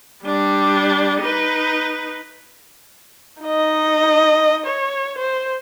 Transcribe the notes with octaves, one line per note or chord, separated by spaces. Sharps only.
G3 D4
D#4 B4
D#4 D#5
C#5
C5